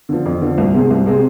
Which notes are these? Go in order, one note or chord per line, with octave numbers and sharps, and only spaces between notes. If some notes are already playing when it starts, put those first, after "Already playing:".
D3 F3
F2
D3 F3
C2
C3 G#3 C4
C2
C3 G#3 C4